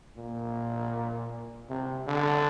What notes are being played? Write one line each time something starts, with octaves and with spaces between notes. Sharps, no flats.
A#2
C3
D3